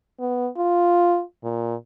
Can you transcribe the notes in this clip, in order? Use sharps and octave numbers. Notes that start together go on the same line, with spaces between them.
B3
F4
A#2